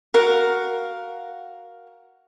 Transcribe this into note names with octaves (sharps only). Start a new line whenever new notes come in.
F#4 A#4 F5 F#5